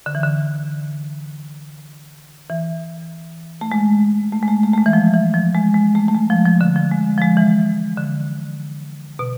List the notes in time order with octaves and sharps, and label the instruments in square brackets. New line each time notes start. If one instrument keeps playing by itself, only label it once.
[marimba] D3
E3
D3
E3
A3
G#3
A3
G#3
A3
A3
A3
G#3
E3
F3
E3
F3
G#3
G#3
A3
A3
G#3
F3
F3
D3
F3
G#3
F3
G#3
E3
D3
B2